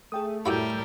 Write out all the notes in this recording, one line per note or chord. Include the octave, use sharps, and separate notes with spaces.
A3 G#4 G5 D#6
A2 G3 E4 F#4 G4 A#4 E6 G6